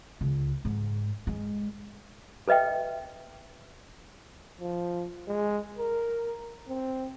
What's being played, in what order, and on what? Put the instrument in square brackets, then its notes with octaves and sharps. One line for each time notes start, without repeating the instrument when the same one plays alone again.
[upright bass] C#2
G#2
G#3
[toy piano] A4 B4 D#5 E5 G5
[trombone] F3
G#3
A#4
C4